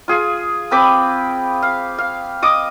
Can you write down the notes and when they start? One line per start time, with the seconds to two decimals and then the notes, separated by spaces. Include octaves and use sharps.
0.08 F4 G#4
0.71 C4 B4 B5 D6
1.62 F5
1.98 F5
2.42 D#5 D6 D#6